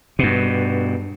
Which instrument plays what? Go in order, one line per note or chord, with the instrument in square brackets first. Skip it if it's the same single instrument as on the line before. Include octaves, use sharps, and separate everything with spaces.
[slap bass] G2 B2